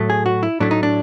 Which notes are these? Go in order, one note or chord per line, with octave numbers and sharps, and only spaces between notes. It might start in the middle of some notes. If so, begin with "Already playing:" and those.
Already playing: A2 F#3 A3
G#4
F#4
E4
A2 F#3 A3 D4
D#4
D4